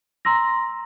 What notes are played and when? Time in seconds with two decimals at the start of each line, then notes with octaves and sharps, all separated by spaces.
0.25 A#5 C6 E6 A#6